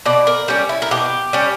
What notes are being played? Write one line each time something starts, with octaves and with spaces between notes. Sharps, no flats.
B2 D5
A#4
G3 C#4
E4
A#4
B2 G4
G3 C#4